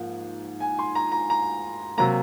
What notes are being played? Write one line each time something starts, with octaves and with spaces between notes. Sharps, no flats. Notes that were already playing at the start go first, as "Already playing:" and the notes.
Already playing: G#2 F3 A#3
G#5
C6
A#5
A#5
A#5
C3 F#3 A#3 A#5